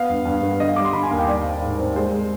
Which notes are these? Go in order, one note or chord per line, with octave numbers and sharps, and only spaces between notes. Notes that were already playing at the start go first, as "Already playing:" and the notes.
Already playing: B3 F5
G2
G2
B3
D3 D#5
F5
G3 D6
C6
D3 B5
G#5
D#2 F5
G5
G3 D5
C4
G#2
C4
G#3 C5
G#3